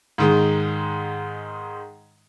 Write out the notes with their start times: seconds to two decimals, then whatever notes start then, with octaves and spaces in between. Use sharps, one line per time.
0.18 G#2 D#3 G#3